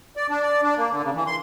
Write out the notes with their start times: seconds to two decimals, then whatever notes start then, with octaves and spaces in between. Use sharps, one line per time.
0.17 D5
0.30 D4
0.42 D5
0.64 D4
0.77 A#3
0.90 D3
1.03 C#3
1.15 E3
1.27 C6